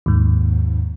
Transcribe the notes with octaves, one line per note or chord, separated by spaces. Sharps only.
D#2 G#2